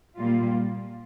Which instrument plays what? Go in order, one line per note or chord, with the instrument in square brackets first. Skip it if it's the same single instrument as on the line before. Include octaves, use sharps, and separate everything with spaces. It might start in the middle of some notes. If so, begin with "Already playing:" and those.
[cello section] A#2 G3 A#3 F4